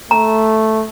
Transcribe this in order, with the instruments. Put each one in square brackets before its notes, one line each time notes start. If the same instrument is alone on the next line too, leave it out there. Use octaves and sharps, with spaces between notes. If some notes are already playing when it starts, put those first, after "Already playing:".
[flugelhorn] A3 [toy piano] A#5